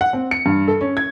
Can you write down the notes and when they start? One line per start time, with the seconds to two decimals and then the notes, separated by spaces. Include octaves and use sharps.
0.01 F#5
0.13 C4
0.31 C#7
0.46 G2
0.68 A4
0.81 C#4
0.97 G#6